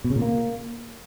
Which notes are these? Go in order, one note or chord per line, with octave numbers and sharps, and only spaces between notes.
B2
C#3
A#2
A#3